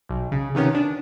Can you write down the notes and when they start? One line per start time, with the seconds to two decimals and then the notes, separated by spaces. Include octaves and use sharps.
0.09 B1
0.32 C#3
0.55 C3 D#3 B3 C#4
0.75 D4